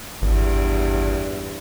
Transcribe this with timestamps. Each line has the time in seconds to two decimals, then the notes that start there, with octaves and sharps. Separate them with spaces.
0.22 G#1 E2 G2